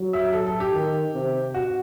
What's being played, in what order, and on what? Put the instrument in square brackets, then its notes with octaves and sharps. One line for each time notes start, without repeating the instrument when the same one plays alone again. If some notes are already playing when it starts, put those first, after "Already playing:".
Already playing: [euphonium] F#3
[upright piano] E5
A4
A4
G4
[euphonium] D#3
C3
[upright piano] F#4